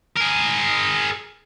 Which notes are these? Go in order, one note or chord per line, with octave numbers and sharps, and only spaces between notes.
G#4 A#4